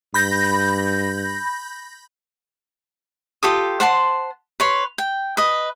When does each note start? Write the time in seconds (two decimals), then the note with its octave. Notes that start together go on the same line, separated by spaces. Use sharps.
0.14 G2 B5 G6 A#6
3.43 F4 G4 A4 D#6
3.80 C5 F#5 A5 C6
4.60 B4 C#5 C6
4.98 G5
5.37 B4 D#5